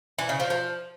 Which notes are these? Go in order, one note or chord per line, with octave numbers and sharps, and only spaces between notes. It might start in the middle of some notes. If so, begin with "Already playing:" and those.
E3
C#3
F3
F3